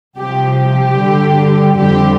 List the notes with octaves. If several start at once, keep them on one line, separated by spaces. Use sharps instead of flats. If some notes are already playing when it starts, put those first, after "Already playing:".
C2 C3 F3 G4
G4
G2 D3 G3
F2 D3 G3 G4